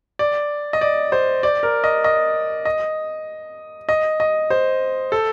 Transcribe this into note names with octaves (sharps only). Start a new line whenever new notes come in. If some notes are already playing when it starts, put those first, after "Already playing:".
D5
D#5
D5
C5
D5
A#4
D#5
D#5
D#5
D#5
D#5
C5
A4